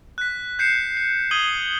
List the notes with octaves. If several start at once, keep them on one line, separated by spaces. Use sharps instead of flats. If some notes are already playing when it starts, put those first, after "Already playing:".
F#6 B6
G6 C7 C#7 E7
C7
D#6 G#6 D#7 F#7 G7